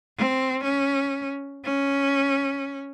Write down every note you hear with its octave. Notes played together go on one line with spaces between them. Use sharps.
C4
C#4
C#4